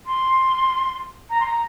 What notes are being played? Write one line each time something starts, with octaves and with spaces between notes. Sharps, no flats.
C6
A#5
C6
A#5